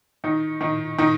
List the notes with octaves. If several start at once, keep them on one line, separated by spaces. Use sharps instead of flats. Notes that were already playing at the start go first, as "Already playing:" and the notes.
D#3 D#4
D#3 D#4
D#3 D#4